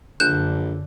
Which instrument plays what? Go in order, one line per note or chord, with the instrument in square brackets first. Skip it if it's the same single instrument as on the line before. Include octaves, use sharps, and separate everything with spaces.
[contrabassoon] A#1 [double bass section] F#2 D3 [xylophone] F#6 G6 E7